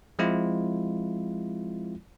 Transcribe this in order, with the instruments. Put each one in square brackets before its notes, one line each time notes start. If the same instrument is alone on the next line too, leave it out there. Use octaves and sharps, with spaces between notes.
[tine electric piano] F3 G#3 C4 E4 F4